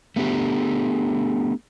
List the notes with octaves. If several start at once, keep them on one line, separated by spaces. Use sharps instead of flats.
A3 B3 D4 G4